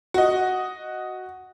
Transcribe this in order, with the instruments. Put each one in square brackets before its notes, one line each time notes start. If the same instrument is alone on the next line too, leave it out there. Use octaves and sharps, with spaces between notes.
[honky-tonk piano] F#4 D#5